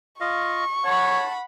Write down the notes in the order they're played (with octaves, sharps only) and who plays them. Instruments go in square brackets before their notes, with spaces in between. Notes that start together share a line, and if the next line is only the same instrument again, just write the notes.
[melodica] F4 D#5 F5 [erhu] C#6
[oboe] C#5 [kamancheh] F#5 B5 [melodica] A5